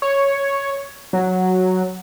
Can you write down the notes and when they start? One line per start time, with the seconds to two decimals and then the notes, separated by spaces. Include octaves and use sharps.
0.02 C#5
1.13 F#3